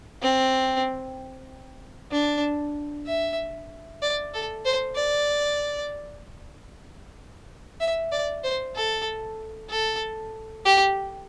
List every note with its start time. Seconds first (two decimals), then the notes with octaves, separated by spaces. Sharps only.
0.22 C4
2.12 D4
3.07 E5
4.02 D5
4.34 A4
4.65 C5
4.96 D5
7.80 E5
8.12 D5
8.43 C5
8.75 A4
9.70 A4
10.65 G4